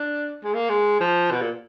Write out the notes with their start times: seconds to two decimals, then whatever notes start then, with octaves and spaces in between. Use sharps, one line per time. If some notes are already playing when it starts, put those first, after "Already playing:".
Already playing: D4
0.44 G#3
0.54 A#3
0.69 G#3
1.00 F3
1.31 B2
1.41 A#2